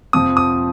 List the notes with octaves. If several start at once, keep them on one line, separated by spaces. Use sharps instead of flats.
F2 C3 F3 C4 D#6
D#6